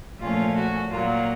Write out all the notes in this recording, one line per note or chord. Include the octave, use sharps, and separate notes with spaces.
A#2 F3 A3 C#4 F4
F#4
A#2 F#3 A#3 F4